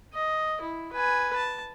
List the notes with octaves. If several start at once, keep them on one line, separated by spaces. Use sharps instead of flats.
D#5
E4
B4 G#5
A5